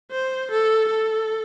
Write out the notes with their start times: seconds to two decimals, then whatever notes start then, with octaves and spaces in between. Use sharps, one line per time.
0.11 C5
0.51 A4
0.89 A4